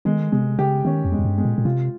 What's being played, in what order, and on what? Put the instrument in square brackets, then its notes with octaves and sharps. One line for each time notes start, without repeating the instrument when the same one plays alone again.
[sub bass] D#3 [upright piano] G#3
[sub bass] C3 [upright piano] G#3
[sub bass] C#3 [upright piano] G4
[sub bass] D#3 [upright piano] C#4
[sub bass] F2
[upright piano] G#3
[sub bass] F2
G2
[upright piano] G#3
[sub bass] A#2
A#2
[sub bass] C3 [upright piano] F4